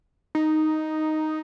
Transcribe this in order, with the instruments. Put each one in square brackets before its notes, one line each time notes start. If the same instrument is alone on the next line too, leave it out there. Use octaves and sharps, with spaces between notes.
[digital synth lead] D#4